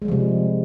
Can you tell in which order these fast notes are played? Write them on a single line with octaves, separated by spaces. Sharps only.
G#3 G3 F3 C3